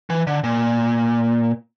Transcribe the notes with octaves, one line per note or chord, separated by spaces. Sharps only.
E3
D3
A#2